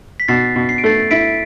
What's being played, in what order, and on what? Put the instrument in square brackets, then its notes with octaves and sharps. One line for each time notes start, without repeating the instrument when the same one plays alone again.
[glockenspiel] B6
[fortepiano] B2 [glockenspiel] A6 C7
[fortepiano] B2
[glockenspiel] C7
D7
[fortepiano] A3 [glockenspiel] A6 C7
[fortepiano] E4 [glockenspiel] B6 D7